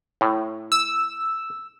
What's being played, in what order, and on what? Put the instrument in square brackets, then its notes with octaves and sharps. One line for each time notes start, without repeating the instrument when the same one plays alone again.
[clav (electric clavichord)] A2
[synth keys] E6